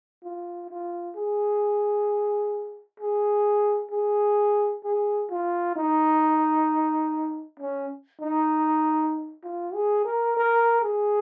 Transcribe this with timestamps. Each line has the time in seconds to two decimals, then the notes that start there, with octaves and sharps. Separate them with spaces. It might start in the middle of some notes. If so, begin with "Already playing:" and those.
0.24 F4
0.69 F4
1.16 G#4
3.00 G#4
3.91 G#4
4.84 G#4
5.30 F4
5.76 D#4
7.60 C#4
8.21 D#4
9.43 F4
9.74 G#4
10.05 A#4
10.37 A#4
10.82 G#4